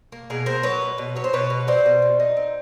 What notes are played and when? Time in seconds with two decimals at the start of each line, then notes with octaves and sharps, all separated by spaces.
0.12 A#3
0.30 B2 G#4 A#4
0.46 B2 A#4 C5
0.63 F#3 B4 C#5
0.82 B2
0.98 B2
1.16 F#3 C#5
1.24 C5
1.33 B2 B4 C#5
1.50 B2
1.67 F#3 C5 D5
1.86 B2
2.02 B2
2.20 D#4
2.37 C4